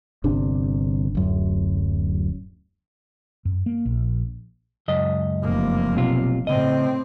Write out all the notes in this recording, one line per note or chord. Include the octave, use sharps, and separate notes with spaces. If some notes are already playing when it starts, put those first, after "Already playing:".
G1 C3 D4
D1 F#2
F#2
A#3
A#1
C#2 F#2 D#5
F1 A#3
B1 C3 F4
A2 C#3 C4 D#5